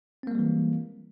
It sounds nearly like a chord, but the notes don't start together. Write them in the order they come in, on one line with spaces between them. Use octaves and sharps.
C4 A#3 G#3 G3 E3